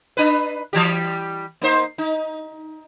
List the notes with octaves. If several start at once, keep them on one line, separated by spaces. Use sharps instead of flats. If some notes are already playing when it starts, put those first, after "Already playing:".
D4 B4
E3 G3 G4
A#3 D#4 C5
D#4